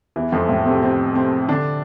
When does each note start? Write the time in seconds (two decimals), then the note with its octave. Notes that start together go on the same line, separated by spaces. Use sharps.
0.16 E2 E3
0.32 F2 F3
0.49 A2 A3
0.66 C3 C4
0.82 C3 C4
1.15 C3 C4
1.49 D3 D4